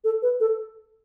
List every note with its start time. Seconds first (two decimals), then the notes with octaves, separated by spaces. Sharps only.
0.04 A4
0.22 B4
0.40 A4